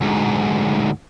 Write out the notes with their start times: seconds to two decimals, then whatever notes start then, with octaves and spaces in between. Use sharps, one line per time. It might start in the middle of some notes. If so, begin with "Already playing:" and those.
0.01 D2 G#2